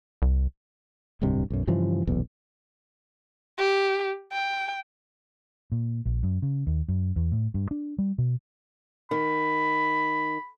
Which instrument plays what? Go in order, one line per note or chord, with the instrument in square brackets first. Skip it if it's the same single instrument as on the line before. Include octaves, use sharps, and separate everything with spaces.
[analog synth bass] C2
[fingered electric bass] D1 C2 G2 C3
B1 F#2
G2 C#3 E3 F3
D#1 B1 E2
[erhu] G4
G5
[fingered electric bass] A#2
A#1
F#2
C#3
D#2
F#2
E2
A2
G2
D4
G3
B2
[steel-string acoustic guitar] D#3 [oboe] B5